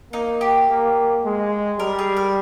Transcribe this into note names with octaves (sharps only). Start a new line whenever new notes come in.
A#3 D#4
G4
A#3
G#3
G3 A#4
G#4
A#4